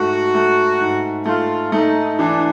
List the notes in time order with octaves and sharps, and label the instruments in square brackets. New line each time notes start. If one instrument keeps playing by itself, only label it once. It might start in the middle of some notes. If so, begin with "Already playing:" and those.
Already playing: [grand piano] G#2 A3 [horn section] F#4
[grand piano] A3
G#2
[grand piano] A3 [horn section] F4
[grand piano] A3 [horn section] D#4
[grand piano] E3 [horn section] D4